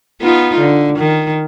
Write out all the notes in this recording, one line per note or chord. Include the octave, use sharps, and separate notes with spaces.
B3 D#4 F4
D3
D#3